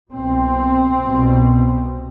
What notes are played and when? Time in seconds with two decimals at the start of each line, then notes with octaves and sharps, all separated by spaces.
0.11 C2 B2 C4
1.02 C2 B2